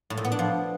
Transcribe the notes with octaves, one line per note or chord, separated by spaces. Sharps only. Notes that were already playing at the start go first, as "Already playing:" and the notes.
A2
A#2
B3
D4
F3